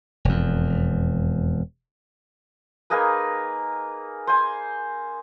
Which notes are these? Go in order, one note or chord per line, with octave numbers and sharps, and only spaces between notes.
E1 F2
A#3 D#4 G#4 B4
C5 G#5